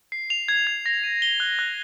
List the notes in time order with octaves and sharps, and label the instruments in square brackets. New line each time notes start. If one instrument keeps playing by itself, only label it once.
[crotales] C7
F7
G#6
G#6
A#6
D#7
G7
F#6
F#6